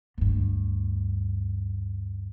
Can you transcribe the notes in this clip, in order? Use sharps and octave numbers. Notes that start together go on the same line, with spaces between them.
D2 G2